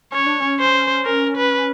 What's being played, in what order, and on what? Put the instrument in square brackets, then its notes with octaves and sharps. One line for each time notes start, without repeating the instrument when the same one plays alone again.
[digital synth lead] C#4 [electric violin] C#5
[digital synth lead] D4
C#4
[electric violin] C5
A#4
B4